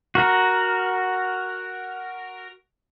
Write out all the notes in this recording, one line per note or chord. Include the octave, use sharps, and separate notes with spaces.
F#4 A#4